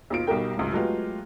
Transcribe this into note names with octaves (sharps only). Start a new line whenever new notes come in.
D#2 B2 F4 D7
B1 G3 D#4 F#4 A#4 G5
C#2 F#2 A2
F#3 G#3 A3 B3 F4 G4